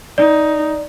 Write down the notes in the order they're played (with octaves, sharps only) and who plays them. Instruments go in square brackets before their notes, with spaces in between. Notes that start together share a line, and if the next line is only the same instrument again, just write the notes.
[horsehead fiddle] D#4 [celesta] D5